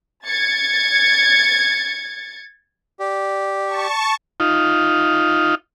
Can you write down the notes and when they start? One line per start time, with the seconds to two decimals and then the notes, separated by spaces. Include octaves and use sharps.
0.26 G#6 A6 C#7
2.99 G4 D5
3.66 A5 C#6
4.40 D#4 F4